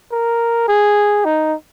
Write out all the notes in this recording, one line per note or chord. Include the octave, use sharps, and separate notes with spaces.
A#4
G#4
D#4